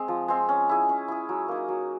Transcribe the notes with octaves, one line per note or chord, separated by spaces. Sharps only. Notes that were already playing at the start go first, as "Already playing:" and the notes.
Already playing: G#3 C4
F3
G#3 C4
C#4
E4 G#4
C#4
E4 G#4
F#3
A#3 D#4
F#3